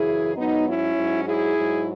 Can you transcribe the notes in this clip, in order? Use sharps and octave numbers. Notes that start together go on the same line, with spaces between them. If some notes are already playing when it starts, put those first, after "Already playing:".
Already playing: F#2 C#3 E3 E4 G#4
G#2 F#3 B3 D#4
C#4 E4
G#2 F#3
E4 G#4
G#2 F#3